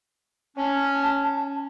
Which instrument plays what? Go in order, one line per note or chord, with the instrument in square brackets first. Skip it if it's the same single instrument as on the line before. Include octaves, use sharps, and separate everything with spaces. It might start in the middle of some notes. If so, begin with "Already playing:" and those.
[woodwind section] C#4 [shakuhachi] A5